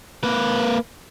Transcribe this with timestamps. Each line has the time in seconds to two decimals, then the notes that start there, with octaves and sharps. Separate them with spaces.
0.23 A#3 B4